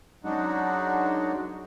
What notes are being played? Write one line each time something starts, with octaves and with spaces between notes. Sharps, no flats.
F#2 F#3 G#3 D4 D#4 F#4